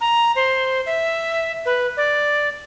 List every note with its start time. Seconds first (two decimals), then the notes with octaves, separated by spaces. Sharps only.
0.01 A#5
0.36 C5
0.86 E5
1.65 B4
1.97 D5